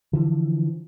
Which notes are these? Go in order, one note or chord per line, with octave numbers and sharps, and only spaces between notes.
D3 E3 F3